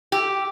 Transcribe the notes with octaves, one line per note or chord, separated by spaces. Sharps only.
G4